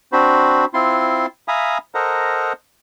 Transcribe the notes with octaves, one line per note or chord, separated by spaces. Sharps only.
C4 D4 F#4 C5 B5
C4 E4 F4 C6
E5 F5 G#5 A#5 B5 D#6
A4 A#4 C5 D#5 F#5 A#5